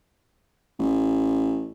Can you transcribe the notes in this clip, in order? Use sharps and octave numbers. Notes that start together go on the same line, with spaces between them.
A1